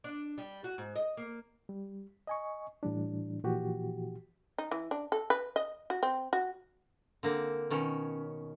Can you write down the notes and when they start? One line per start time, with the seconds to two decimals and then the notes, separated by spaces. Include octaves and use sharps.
0.04 D4
0.38 G3
0.64 F#4
0.78 G#2
0.96 D#5
1.17 A#3
1.69 G3
2.27 D#5 G#5 C#6
2.83 A2 E3 G3 D4
3.44 A#2 E3 F3 F#4 G4
4.58 D#4
4.71 E3
4.91 D4
5.12 A4
5.30 B4
5.56 D#5
5.90 F#4
6.03 C4
6.33 F#4
7.23 D3 A#3 C4
7.71 B2 D#3 C#4